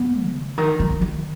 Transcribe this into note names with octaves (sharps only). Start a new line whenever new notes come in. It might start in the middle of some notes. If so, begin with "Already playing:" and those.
Already playing: B3
C#3
D#3
F3
D#3